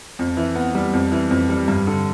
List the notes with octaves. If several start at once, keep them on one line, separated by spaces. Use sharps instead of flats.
F2
E3
B3
G3
F2
E3
F2
G3
G2
D3